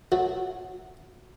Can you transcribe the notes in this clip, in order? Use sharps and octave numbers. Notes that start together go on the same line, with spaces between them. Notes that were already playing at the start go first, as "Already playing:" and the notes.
F#3 A3 F#4 A4